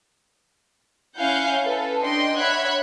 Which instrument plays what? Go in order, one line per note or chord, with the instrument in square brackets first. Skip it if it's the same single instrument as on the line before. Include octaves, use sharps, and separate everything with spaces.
[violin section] C#4 E4 F5 F#5 G#5 G6
A4 B4
D4 D#5 G5 C6
C#5 E5 F#5 B5 F#6 G#6